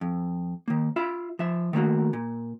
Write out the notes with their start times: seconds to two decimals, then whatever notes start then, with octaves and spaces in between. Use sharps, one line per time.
0.01 F2
0.68 D#3 A#3
0.96 F4 E5 B5
1.39 F3 E5
1.73 D#3 A3 A#3 F#4
2.13 A#2